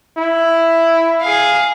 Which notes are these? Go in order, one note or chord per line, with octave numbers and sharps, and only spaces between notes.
E4
G#4 F5